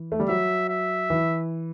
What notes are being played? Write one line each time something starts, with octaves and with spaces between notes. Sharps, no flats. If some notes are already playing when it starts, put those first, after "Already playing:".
Already playing: E3
A3
G3
F#3 E5
E5
E3